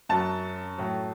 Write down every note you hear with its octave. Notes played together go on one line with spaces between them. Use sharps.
F#2 F#3 A5
A2 F#3